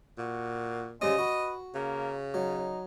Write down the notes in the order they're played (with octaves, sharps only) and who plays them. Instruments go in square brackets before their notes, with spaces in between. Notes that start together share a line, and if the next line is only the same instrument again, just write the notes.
[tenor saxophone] A#2 [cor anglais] F#4
[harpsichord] C#3 G3 C4 [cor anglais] G#3 [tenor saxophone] D#5
[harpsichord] F#4 [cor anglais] B4
[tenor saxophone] C#3 [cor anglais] A#3
[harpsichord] F#3 [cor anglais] D#4